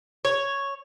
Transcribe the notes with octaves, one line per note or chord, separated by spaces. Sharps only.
C#5